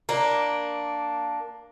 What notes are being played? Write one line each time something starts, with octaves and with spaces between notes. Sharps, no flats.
A#3 D4